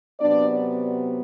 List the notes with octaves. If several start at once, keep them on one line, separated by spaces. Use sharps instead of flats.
C3 F#3 B3 D4 D5